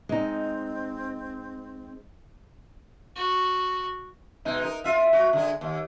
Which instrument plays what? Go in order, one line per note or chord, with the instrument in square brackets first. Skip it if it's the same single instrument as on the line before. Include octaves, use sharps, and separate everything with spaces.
[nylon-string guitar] G#3 D#4 [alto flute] C4
[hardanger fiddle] F#4
[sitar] B2 G#3 D#4
D#4 A#4
F4 E5
F#4
D3 G#3
D#2